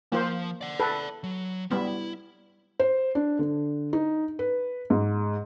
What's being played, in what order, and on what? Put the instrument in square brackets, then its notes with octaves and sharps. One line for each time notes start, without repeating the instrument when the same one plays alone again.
[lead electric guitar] F3 [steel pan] A#3 F4 C5
[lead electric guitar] D5 F#5
[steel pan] A4 B4
[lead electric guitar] F#3
[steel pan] G3 B3 [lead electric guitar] E4
[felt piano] C5
D4
D3
D#4
B4
G#2